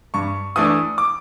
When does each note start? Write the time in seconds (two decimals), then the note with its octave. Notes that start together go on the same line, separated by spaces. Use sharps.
0.14 G2 C#6
0.56 E3 A3 D4 D#6
0.98 D6